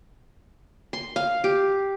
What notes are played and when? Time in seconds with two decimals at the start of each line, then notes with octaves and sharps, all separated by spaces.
0.93 C6
1.16 F5
1.44 G4